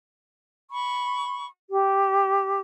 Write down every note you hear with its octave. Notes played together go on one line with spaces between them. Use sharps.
B5 C#6
G4